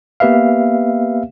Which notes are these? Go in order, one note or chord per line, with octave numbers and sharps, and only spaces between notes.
A#3 B3 G4 B4 E5 F5